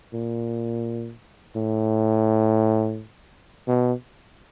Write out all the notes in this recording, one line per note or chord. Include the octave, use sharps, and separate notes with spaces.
A#2
A2
B2